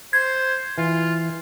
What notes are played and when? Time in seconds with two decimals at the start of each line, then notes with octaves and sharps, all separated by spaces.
0.13 C5 G#6
0.78 E3 F4